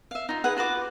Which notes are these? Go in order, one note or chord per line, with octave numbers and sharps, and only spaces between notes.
E5 F5
D#4 F4
G#4 B4 F#5
F4 F#4 B4 D6